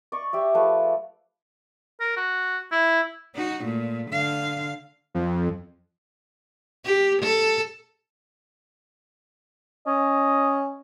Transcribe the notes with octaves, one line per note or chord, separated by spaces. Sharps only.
D5 D#5 C#6
G4 D5 E5
F3 A3 G#4 B4
A#4
F#4
E4
D#4 F#4
A#2 A3
D3 F5
F2
G4
A4
C#4 D#5